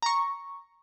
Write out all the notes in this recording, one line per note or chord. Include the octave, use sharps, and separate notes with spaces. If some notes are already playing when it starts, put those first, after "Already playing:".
A#5 C#6